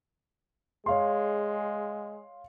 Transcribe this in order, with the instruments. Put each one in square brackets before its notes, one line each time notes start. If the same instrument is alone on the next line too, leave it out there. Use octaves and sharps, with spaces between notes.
[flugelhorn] G#3 [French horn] G#4 [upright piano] C#5 F5 C6